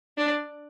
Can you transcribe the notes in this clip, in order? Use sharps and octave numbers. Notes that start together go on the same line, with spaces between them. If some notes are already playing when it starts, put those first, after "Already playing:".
D4